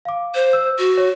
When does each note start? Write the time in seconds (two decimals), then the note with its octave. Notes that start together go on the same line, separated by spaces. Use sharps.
0.05 F5 D6
0.35 C5
0.53 E6
0.78 F#4
0.98 C#5